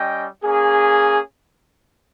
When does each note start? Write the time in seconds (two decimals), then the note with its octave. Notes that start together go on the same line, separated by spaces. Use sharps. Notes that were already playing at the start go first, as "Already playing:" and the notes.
Already playing: G3 C#4 D#5 G5
0.44 A#3 C#4 G#4